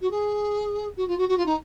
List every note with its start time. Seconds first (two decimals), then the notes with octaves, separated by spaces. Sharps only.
0.01 F#4
0.11 G#4
0.96 F#4
1.08 F4
1.18 F#4
1.28 F#4
1.37 F4
1.46 D#4